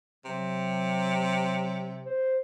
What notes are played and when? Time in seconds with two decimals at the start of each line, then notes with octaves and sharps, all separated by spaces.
0.25 C3 F#3
2.05 C5